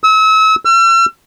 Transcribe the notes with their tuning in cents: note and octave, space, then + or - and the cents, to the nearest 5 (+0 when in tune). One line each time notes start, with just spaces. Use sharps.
E6 -35
E6 +45